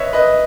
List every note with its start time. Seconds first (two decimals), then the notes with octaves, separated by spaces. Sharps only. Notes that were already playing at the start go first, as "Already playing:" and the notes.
Already playing: B4 C#5 D#5 E5
0.13 B4 D#5